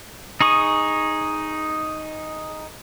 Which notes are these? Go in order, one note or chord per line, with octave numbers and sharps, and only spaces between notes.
D#4 G#4 C#6 D#6